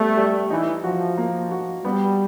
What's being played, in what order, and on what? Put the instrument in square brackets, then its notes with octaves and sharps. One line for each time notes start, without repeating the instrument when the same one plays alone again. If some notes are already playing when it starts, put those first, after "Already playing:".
Already playing: [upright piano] G3 B3 [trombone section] A3
[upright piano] G3
[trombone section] E3 [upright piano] D#4
[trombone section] F3 [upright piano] F#4
[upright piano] A#3
F#4
[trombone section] G3 [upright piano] B3